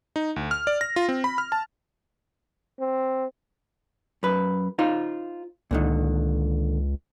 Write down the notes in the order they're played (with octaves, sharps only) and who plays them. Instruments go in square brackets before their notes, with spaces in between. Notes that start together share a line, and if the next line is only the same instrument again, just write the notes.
[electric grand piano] D#4
D2
F6
D5
A#6
F4
C4
B5
F6
A5
[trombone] C4
[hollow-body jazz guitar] F#2 B4
D#4 F4 C5
[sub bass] C#2 [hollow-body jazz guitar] A#2 D3 D#3